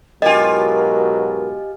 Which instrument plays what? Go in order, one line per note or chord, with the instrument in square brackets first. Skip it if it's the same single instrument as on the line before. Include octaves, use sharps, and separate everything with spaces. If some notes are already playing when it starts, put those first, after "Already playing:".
[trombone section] G#2 B2 F#3 [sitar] F4 G4 [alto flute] A#4 [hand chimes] D#5 G#5